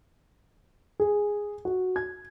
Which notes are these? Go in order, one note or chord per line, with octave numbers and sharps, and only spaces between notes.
G#4
F#4
G#6